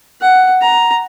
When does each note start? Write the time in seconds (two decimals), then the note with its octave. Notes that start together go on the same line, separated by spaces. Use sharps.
0.21 F#5
0.61 A#5